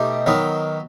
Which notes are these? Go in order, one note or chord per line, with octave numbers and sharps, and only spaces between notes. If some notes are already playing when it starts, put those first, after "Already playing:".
Already playing: B2 A3 D#4 G4
D#3 F#3 B3